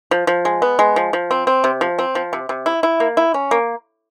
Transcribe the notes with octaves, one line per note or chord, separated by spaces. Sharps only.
F3
F3
G#3
B3
G#3
F3
F3
C4
C4
C3
F3
C4
F3
C3
C3
E4
E4
A#3
E4
C#4
A#3